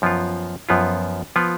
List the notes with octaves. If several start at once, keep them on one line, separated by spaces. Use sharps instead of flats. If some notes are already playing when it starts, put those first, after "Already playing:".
F#2 F3 B3 F4
F#2 F3 B3 F4
F3 B3 F4